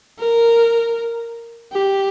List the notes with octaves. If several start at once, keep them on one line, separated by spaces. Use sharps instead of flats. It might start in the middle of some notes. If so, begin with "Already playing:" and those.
A#4
G4